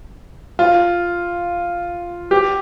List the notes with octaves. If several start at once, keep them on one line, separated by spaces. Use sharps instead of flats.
F4
G4